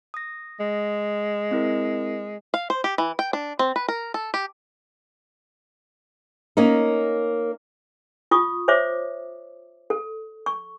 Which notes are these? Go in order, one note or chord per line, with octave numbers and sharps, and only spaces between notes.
D#6 A#6
G#3
C4 E4 A#4
F5
C5
G4
E3
G5
D4
C4
B4
A#4
A4
G4
A#3 C#4 D#4
F4 C#6 D#6
C5 C#5 E5 D6
A4
C#6